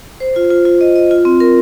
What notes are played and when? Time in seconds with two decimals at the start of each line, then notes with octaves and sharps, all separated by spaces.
0.20 C5
0.36 F4
0.51 F4
0.65 F4
0.81 D#5
0.96 D#5
1.11 F4
1.25 C4
1.40 A#4